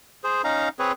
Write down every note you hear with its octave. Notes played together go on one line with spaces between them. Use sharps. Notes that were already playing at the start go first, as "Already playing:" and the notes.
G#4 C5
C#4 D#4 F5 A#5
C4 G#4 B4 C#5